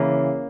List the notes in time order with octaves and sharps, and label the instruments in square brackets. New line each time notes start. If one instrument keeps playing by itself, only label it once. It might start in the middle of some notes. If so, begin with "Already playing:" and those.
Already playing: [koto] C#3 E3 A#3